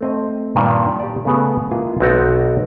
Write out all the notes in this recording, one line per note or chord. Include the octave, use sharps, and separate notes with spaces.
A3 C4 D#5
G2 A#2 D#3
G4 D5
C#3 A3 B3 G#4
G#3 A#3 E4 F4 G#4
B1 C4 D#4 F#4 D5